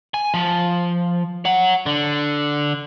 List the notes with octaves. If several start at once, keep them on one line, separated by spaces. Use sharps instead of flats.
G#5
F3
C#5 F#5
D3